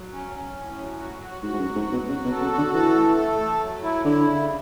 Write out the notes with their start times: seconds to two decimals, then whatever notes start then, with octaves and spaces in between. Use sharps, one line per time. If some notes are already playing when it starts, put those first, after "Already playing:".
Already playing: F#3
0.13 C#4
0.34 C#4
0.57 A2
0.78 F#3
0.99 F#4
1.22 F#4
1.43 G#2 F#4
1.53 G#2
1.60 F#2
1.65 F#3
1.76 G#2
1.87 F#3
1.93 B2
2.08 C#3 F#4
2.25 B2
2.31 A4
2.42 C#3
2.53 D3 F#4
2.74 E3 A4
2.97 A3
3.17 A4
3.40 A3
3.62 F#3
3.83 E4
4.05 D3 E4
4.27 C#3